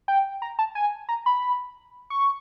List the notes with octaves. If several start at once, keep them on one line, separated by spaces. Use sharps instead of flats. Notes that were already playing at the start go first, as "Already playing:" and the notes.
G5
A#5
A5
G#5
A#5
B5
C#6